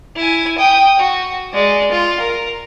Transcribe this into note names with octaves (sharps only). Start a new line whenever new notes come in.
E4 G#5
G5 D#6
F#4
G#3 D5
F4
A#4